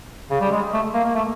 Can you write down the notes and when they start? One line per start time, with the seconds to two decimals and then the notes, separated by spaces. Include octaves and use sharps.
0.30 C#3
0.41 G3
0.51 G#3
0.73 A3
0.94 A#3
1.05 A#3
1.15 A3